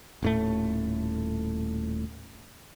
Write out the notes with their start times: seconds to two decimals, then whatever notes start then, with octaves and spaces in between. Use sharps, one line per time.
0.23 D#1 A2 A3